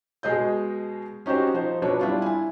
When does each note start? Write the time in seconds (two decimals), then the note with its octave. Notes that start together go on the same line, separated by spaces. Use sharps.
0.23 B2 G#3 G#4 D#5 G6
1.26 C#4 D#4 F#4 G4 C5
1.54 F3 D#4 C5
1.82 B2 F#3 D4 B4 C#5
2.01 G3 D4 E4 F4
2.22 E4 G#5